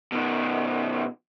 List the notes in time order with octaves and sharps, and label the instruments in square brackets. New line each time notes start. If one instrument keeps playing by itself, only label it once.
[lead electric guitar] B2 D#3